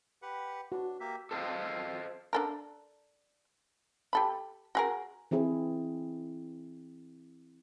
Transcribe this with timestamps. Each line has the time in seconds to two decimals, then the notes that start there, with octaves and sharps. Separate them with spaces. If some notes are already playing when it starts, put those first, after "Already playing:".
0.22 G4 B4 F#5
0.72 D4 F#4
1.00 A#3 G4 E5
1.31 A4 C5 D#5 F5
2.33 D4 A4 A#4
4.13 G4 A4 B5
4.75 F#4 G#4 A#4
5.31 E3 C4 E4 G#4